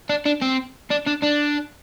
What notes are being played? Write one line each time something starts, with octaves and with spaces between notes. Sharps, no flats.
D4
D4
C4
D4
D4
D4